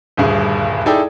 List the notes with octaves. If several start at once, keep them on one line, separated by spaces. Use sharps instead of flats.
D#1 D2 G2 G#4
D#4 E4 G#4 A4 D5 G5